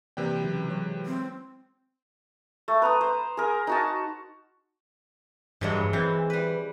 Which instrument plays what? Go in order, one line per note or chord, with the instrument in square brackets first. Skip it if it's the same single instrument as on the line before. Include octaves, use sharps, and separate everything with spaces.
[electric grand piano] C3 B4 G5 [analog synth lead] E3 [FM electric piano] A#3 D5
[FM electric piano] C#3 F#3
F#3 G#3 C#5
[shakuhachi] C4
[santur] A3
B4 A#5 D#6
C5
G#4 A#4
D#4 F#4 A5
[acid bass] G2 [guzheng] E3 F#3 G#3
[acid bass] E3 [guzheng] C4
[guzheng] G3 B4